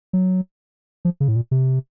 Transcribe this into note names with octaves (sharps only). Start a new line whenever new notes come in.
F#3
F3
C#3
A2
A#2
C3